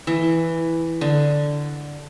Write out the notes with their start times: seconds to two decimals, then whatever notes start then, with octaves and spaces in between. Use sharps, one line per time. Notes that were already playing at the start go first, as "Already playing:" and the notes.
0.07 E3
1.01 D3